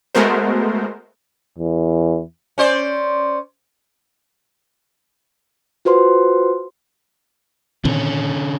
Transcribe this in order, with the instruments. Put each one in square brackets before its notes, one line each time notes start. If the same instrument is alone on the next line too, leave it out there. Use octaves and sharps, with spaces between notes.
[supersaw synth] G#3 A3 B3 F#4 A#4 C5
[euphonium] E2
[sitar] C#4 C5 D5
[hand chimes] F4 F#4 B4 C5 C6
[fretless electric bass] A#2 D#3 C4 [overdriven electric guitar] D3 C#4